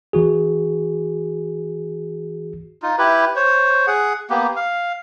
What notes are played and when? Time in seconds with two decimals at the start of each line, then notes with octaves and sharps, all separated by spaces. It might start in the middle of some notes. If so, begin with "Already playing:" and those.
0.13 E3 F#4 G#4
2.82 D#4 F4
2.98 E4 G4 B4
3.36 C5 C#5
3.87 G#4 F#5
4.30 A#3 B3 G4
4.56 F5